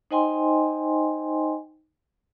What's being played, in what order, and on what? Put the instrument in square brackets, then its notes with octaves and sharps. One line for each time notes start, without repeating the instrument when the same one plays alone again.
[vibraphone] D#4 C5 D#5 G5 G#5 C6